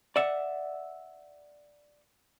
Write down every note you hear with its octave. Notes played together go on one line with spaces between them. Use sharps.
D5 E5 F#5